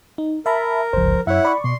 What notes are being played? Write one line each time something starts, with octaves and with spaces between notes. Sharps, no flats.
D#4
A#4 E5 A5 B5
G1 C#2 F3 C5
F#2 E4 C#5 E5 F#5
D5 B5 C#6
B2 C6